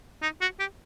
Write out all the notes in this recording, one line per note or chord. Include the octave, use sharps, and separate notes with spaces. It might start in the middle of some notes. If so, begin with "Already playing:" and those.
D#4
F#4
G4